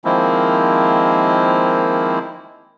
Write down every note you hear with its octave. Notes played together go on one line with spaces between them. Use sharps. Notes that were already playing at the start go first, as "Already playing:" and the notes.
D#3 F3 G#3 A#3 C4 E4